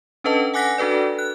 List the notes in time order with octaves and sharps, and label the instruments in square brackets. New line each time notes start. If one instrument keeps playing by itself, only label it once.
[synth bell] C#4 D4 A4 B4 D#5 A5
F#5 G#5 D6 F#6 A#6 B6
D4 F#4 A4 B4 D5
F#6